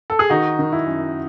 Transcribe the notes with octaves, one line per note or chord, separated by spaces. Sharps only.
A4
G#4
D#3 D#4 F#4
D#3
E4
F#2